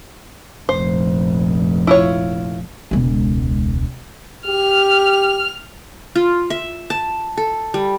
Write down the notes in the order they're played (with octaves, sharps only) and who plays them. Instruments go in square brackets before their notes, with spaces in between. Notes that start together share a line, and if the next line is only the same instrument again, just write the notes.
[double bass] F1 A#1 [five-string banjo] C5
[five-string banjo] E4 F4 C#5
[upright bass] E1 C#2
[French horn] G4 [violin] F6
[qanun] F4
E5
A5
A4
G3